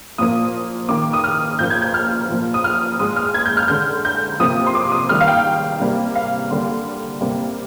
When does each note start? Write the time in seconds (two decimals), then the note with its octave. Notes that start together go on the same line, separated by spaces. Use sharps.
0.18 A#2 F3 A#3 D#6
0.88 D#3 A#3 D6
1.13 D#6
1.24 F6
1.59 A#2 F3 A#3 G6
1.70 G#6
1.82 G6
1.94 F6
2.29 A#2 F3 A#3
2.54 D#6
2.64 F6
2.99 A#2 G#3 D#6
3.16 F6
3.34 G#6
3.45 G6
3.57 F6
3.68 D3 G#3 G6
4.05 G6
4.39 C3 F3 A#3 D#6
4.67 C6
4.75 D6
4.92 D#6
5.09 D#3 G3 A#3 F6
5.21 F5
5.28 G5
5.80 C3 G3 A#3
6.15 F5
6.50 D3 G3 A#3
7.21 C3 G3 A#3